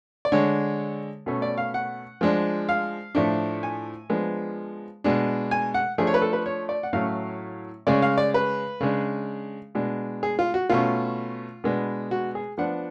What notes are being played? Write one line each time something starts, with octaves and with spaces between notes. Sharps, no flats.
D5
D3 G#3 D4 C#5
B2 A3 C#4
D5
F5
F#5
F3 G#3 D4
F5
A2 F3 A3 D4
G#5
F3 G#3 B3 D4
B2 G#3 D4
G#5
F#5
F3 A3 D4 G#4
C#5
B4
A4
B4
C#5
D5
F#5
A2 F#3 A3 C#4 F5
C#3 G#3 C#4 D5
F5
D5
B4
C#3 G#3 D4
B2 G#3 D4
G#4
F4
F#4
B2 A3 C#4 F4
B2 G#3 B3 D4
F#4
G#4
F3 B3 D4 F#5